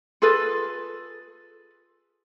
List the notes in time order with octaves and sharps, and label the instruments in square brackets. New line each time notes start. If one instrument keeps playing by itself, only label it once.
[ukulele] F4 G#4 A4 B4